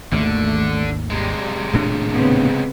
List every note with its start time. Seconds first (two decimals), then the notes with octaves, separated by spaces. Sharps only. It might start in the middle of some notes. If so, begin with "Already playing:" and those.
0.12 G#1 D#2 D3 A3
1.10 C3 G3 G#3
1.73 D#1 A2 D4
2.13 C#3 B3 C4